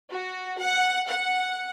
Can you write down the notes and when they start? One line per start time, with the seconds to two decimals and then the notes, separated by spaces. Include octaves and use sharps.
0.10 F#4
0.59 F#5
1.09 F#5